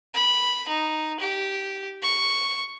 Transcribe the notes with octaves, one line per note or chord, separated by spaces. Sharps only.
B5
D#4
G4
C#6